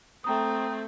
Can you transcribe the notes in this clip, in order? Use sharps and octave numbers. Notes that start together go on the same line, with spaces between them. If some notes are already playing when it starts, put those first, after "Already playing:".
A3 C4 G5 A#5 D#6